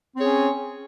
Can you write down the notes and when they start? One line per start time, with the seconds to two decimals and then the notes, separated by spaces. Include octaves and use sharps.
0.16 C4
0.19 C#5
0.21 G#4
0.24 C#4